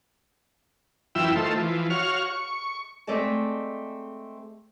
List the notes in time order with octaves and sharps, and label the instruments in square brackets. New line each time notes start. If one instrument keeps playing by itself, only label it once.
[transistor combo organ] F#2 E3 E4 F4 G5 E6
D#3 A3 F4 A4 C5
E3 F3
F#4 C#5 F5 F6
C#6
[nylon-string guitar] G#3 A3 C4 D5 D#5 A5